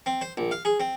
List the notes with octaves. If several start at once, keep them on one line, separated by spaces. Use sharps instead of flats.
C4
C5
A#1
F5
G#4
C4